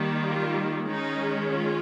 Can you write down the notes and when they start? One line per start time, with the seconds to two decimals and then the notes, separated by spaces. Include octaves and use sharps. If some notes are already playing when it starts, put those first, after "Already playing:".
Already playing: D#3 G3 A#3
0.22 F4
0.86 D#3 G#3 C#4 D#4
1.51 F4